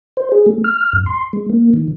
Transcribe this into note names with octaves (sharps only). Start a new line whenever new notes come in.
C5
G#4
A3
F6
F#2
C6
G#3
A#3
D#3